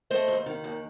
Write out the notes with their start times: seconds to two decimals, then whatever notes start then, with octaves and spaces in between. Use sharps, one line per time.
0.10 A3 C5 D#5
0.28 D#2
0.46 D#3
0.64 D#2